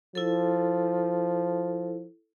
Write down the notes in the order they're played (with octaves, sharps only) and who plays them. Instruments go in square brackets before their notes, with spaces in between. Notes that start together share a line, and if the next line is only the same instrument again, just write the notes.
[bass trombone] F3 [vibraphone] E4 A4